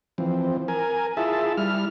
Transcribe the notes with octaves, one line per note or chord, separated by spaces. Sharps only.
E3 F3 C4
A#4 G#5
E4 F4 G#4 E5 A5
G3 E4 F6